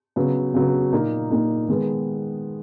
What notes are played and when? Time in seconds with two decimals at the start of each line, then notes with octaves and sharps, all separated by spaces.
0.16 C#3 F#3 B3
0.54 C#3 F#3 B3
0.92 A#2 A#3 D#4
1.31 A#2 A#3 D#4
1.69 D#3 G#3 B3